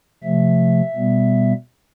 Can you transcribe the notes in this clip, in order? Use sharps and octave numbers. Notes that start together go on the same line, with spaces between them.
C3 F3 A3 E5
B2 G3 B3